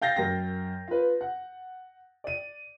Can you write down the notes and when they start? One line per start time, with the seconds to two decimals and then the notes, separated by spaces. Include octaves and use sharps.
0.02 F5 G5 G6 A6 A#6 C7
0.17 F#2 A#4 G5 A#6
0.87 F4 B4
1.21 F#5
2.24 D5 D#7